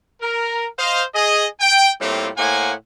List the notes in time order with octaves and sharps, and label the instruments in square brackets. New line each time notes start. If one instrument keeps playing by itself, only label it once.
[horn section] A#4
C5 D#5 F5
G#4 D#5
G5
A2 G3 A3 A#3 C4 F4
A2 A#3 C5 F#5 G#5